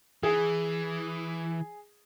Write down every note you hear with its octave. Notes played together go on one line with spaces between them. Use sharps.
E3 G#4